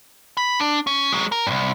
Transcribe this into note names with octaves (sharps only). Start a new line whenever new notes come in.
B5
D4
C#4
F#3 G#3
A#4
C2 G2